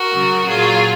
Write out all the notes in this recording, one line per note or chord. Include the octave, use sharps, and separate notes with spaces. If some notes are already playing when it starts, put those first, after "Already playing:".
Already playing: F#4 A#4
C#3 F#3
A#2 F#3 F4 G#4